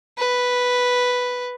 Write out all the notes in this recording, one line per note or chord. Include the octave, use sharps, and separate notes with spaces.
B4